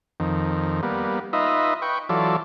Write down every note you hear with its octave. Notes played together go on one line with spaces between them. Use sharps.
F2 D#3
G3 A#3 B3
D#4 F4 B4 D#5 E5
B4 G5 C#6
E3 F#3 F4 A4 D5